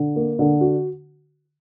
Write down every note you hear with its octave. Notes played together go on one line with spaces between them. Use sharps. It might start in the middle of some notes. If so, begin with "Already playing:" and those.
Already playing: D3
A#3
D3
F#4